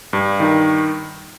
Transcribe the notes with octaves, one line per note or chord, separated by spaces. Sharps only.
G2
D#3